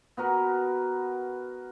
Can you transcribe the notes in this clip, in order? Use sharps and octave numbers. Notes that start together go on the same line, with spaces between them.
B3 F#4 A#4 B4